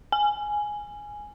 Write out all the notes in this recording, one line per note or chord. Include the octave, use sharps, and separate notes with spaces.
G#5